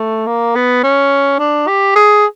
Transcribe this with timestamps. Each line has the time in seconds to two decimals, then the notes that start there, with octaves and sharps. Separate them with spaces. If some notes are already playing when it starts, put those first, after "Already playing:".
Already playing: A3
0.27 A#3
0.56 B3
0.83 C#4
1.39 D4
1.68 G4
1.96 G#4